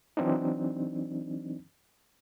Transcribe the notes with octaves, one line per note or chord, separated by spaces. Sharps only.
E3 F#3 C4 D4 D#4